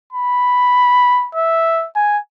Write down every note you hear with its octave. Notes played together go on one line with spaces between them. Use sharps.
B5
E5
G#5